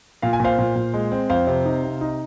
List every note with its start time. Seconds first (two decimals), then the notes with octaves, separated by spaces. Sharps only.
0.22 A#2 F5
0.33 G#5
0.40 A#2 C5 F5
0.58 A#2
0.76 A#2
0.94 G#3
1.12 C4
1.30 F2 C5 F5
1.47 C3
1.65 D#4
1.84 C3
2.01 D#4